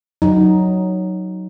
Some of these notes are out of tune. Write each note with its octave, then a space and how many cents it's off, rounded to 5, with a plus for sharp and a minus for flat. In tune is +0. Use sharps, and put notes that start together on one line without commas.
F#3 +5 D#4 +0